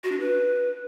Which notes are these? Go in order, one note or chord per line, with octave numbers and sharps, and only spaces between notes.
F#4
D4
B4